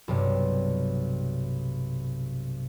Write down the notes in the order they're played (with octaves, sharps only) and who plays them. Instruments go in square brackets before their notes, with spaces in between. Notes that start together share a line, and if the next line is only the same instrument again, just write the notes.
[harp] B1 G2 C3